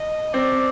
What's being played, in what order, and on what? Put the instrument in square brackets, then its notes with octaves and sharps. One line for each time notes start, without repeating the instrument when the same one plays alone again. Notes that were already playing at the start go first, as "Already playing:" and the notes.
Already playing: [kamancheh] D#5
[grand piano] C4 [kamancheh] D5